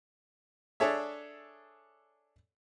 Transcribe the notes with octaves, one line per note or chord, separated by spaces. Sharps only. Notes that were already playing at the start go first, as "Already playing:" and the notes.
D4 G#4 A4 C#5 E5